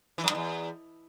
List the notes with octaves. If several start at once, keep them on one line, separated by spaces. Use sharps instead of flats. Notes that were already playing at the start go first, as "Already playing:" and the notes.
E3
F#2
G2
E2